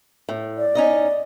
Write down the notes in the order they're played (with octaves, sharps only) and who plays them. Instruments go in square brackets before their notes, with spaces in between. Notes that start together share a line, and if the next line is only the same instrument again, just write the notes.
[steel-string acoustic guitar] A2
[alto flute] D5
[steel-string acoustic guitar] C#4 D#4 D#5